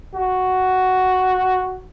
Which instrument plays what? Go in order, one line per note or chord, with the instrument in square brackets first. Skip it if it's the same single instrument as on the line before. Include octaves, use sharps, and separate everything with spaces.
[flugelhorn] F#4